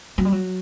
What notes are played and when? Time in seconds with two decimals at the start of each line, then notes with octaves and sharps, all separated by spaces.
0.18 F#3
0.25 G3
0.32 F#3